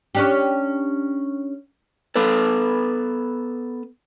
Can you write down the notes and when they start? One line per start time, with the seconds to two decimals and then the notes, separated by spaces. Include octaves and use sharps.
0.15 C#4 D4 G4
2.16 B3 A4 B4